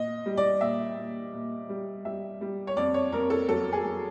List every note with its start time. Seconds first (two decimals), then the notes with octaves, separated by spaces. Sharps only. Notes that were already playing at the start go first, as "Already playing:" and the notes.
Already playing: A#2 D#5
0.26 G3
0.37 D5
0.61 A#2 E5
0.97 A#2
1.33 A#2
1.69 G3
2.05 G3 E5
2.41 G3
2.67 C#5
2.77 F2 D5
2.94 C#5
3.12 F2 A#4
3.30 A4
3.48 F#3 A4
3.72 G#4
3.84 F#3